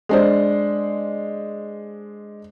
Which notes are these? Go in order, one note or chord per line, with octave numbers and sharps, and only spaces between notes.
G#3 D4 C5